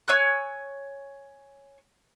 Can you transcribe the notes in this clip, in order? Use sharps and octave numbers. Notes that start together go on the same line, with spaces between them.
C#5 G#5 E6 F#6